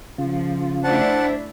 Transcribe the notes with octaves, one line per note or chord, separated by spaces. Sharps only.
C#3 F3 F4
A3 D4 E4 C5 F#5 A5